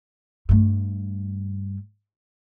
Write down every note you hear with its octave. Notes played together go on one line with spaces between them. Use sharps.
G2 A3